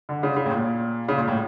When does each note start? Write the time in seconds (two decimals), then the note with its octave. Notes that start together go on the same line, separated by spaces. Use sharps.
0.09 D3
0.23 C#3
0.36 C#3
0.46 A2
0.51 A#2
1.08 C#3
1.18 A#2
1.28 A2